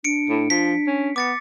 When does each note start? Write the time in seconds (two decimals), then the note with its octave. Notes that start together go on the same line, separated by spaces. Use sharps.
0.04 D4 C#7 D7
0.29 A2
0.50 F3 B6
0.87 C#4
1.16 B3 D6 A6 C#7